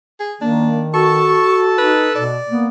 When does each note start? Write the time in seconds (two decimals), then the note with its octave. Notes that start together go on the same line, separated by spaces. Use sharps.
0.20 G#4
0.41 D#3 A#3 D4
0.94 F#4 A4 A5 C#6
1.78 D#4 B4
2.15 B2 D5
2.49 A#3 B3